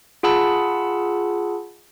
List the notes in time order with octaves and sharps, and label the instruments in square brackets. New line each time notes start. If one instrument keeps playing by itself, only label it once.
[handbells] F4 G#4 F#5 A5 B5 E6